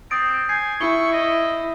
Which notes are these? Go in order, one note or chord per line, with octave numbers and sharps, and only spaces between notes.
C4 D#6 A6 D7
G#5 G6 C7
E4 C#6 G7
D#5